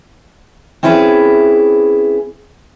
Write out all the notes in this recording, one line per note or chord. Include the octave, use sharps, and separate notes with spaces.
C4 C#4 E4 G#4 B4